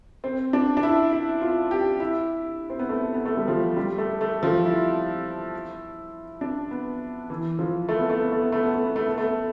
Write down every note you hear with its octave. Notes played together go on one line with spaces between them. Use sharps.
C4
D4
D4
E4
E4
F4
G4
E4
C4
B3
A3
B3
A3
G3
F3
G3
A3
A3
F3
E4
D4
B3
E3
F3
A3
B3
A3
B3
A3
B3
A3
B3
A3
B3
A3
B3
A3